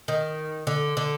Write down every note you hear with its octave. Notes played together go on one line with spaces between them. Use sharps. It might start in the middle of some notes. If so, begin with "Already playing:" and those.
D#3
D3
D3